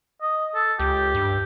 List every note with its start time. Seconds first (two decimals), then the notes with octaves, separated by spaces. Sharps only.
0.22 D#5
0.55 A4
0.80 C#2 G4
1.14 G2